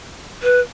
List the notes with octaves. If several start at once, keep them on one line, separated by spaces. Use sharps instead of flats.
B4